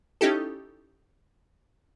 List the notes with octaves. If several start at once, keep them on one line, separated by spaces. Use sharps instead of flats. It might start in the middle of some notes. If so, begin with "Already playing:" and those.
C#4 D#4 E4 G4 A4